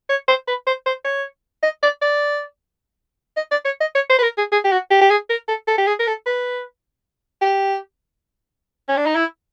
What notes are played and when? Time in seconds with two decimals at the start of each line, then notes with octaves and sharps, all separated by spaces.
0.09 C#5
0.28 C5
0.48 B4
0.67 C5
0.86 C5
1.05 C#5
1.63 D#5
1.83 D5
2.02 D5
3.36 D#5
3.51 D5
3.65 C#5
3.81 D#5
3.95 C#5
4.09 C5
4.18 B4
4.23 A#4
4.38 G#4
4.52 G#4
4.64 G4
4.72 F#4
4.91 G4
5.01 G4
5.10 G#4
5.30 A#4
5.48 A4
5.67 A4
5.78 G4
5.87 G#4
5.99 A#4
6.07 A4
6.26 B4
7.41 G4
8.88 C#4
8.97 D4
9.06 D#4
9.15 E4